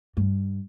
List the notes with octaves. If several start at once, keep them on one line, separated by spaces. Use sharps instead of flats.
G2